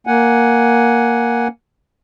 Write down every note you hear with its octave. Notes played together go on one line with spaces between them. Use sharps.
A#3 F#5 G#5